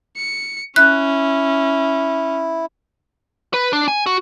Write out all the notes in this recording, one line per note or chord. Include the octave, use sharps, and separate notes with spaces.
C#7
C#4 E4 F#6
B4
D4
G#5
F#4